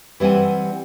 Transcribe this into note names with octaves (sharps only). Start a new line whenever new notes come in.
E3 G3 C4 F#5 G#5